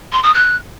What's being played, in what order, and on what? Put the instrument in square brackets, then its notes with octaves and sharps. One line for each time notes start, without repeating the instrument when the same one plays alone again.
[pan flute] C6
D#6
F#6